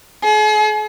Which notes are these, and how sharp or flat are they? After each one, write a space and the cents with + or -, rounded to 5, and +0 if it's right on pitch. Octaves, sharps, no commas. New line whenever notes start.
G#4 +40